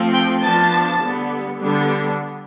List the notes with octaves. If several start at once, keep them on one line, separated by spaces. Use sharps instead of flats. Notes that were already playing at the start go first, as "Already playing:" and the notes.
Already playing: F3 A3 C4
G5
F3 B3 D4 A5
D3 G3 B3
D3 G3 B3 D4